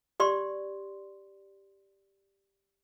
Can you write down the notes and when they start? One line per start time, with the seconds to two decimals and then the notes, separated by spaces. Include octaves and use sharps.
0.20 G4 D5 C6